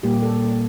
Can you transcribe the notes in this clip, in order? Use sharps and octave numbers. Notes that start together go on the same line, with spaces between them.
A#2 G3 A#3 G4
A4